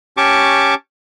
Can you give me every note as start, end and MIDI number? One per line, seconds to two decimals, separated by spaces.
0.17 0.74 61
0.17 0.74 67
0.17 0.74 81
0.17 0.74 85
0.17 0.74 86